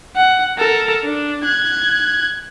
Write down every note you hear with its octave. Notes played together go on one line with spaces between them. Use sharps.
F#5
A4 A#4
D4
F#6 G#6